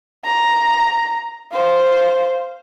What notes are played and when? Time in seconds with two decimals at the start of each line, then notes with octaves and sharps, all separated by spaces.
0.25 A#5
1.53 C5 F5